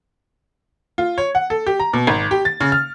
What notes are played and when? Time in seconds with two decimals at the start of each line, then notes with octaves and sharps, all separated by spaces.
0.98 F4
1.18 C#5
1.35 F#5
1.50 A4
1.66 G4
1.80 A#5
1.93 B2
2.07 G#1
2.31 G4
2.45 A6
2.60 C#3
2.72 F6